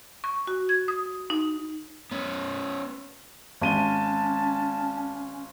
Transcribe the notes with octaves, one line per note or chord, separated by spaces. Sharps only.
C#6
F#4
G#6
D#6
D#4
B3 C#4
G#1 C#4 A5 D#7 G7